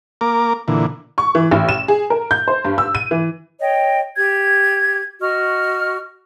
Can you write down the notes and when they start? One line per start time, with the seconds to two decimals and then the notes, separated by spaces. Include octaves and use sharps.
0.21 A#3 A#4 D6
0.68 A#2 D3 E3
1.18 C#6
1.35 E3
1.51 A1
1.69 E7
1.88 G#4
2.10 A#4
2.31 G6
2.48 C5
2.65 G2
2.78 E6
2.95 D#7
3.11 E3
3.61 C#5 D#5 G5
4.16 G4 G#6
5.21 F#4 D#5 C#6 F6